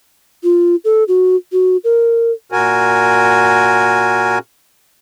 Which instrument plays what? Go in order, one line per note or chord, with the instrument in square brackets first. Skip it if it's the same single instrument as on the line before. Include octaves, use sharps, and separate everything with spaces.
[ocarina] F4
A4
F#4
F#4
A#4
[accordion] A#2 F#4 A#4 G#5